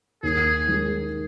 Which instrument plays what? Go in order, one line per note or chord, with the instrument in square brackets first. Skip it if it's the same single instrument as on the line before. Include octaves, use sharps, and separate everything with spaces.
[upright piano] D#2 [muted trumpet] G#4
[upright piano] D#3 G#3